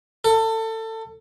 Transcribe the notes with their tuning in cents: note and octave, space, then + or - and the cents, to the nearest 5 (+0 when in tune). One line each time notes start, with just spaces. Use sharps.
A4 +25